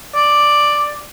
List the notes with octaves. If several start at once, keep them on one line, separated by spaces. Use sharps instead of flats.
D5